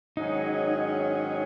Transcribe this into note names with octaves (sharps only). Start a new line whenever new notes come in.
G#2 D#3 F#3 C#4 D#4 G#4